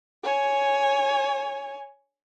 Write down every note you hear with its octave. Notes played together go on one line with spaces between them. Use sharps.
C#5 G#5